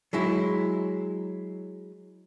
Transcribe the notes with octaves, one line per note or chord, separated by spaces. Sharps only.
F#3 G#3 E4